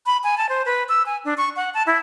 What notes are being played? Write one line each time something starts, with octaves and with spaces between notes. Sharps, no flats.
B5
G#5
A5
C5
B4
E6
G#5
D4
C#6
F#5
A5
E4